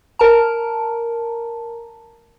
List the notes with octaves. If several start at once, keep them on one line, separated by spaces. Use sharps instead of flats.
A#4 A5 A#5